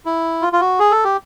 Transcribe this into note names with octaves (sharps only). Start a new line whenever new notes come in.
E4
F4
F4
F#4
G#4
A4
G4